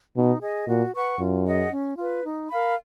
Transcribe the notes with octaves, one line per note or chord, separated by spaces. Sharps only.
B2 D#4
G#4 D#5
A#2 F#4
B4 F#5 C#6
F#2 F4
G#4 D#5 F#5
C#4
F4 B4
D#4
A#4 F5 B5